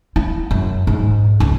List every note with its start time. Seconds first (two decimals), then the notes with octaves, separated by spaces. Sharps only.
0.16 E4
0.51 F#2
0.87 G#2
1.40 C#2